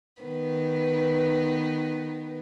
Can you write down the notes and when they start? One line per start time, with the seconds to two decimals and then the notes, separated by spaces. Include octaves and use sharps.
0.22 D#3 B3 B4